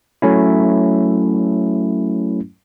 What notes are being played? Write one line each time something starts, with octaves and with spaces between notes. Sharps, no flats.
F#3 A3 C#4 E4